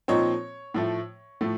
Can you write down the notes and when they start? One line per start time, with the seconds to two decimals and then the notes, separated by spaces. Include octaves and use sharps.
0.08 A#2 F3 C4 D#4 C#5
0.74 A2 F3 A3
1.41 A2 F3 A3